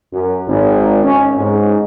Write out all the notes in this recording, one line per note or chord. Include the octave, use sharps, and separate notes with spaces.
F#2
G#1
C#4
G#2